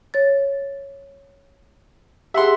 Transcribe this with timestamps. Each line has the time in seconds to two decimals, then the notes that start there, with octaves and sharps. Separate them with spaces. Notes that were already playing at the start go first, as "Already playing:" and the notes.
0.14 C#5 A6
2.34 G4 G#4 E5 F#5 C6